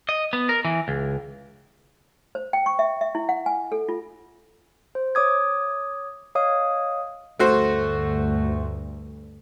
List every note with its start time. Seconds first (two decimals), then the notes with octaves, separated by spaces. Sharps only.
0.09 D#5
0.33 B3
0.49 A#4
0.65 E3
0.88 C#2
2.35 C5
2.53 G5
2.66 C#6
2.79 E5
3.01 E5
3.15 E4
3.29 F#5
3.46 G#5
3.72 A4
3.89 F4
4.95 C5
5.15 C#5 D6 D#6 G#6
6.35 C#5 D#5 F5 D#6
7.39 D2 G2 A3 F#4 C5